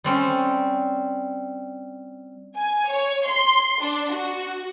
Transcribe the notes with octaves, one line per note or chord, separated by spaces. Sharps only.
G3 C4 C#4
G#5
C#5
C6
D4
F#4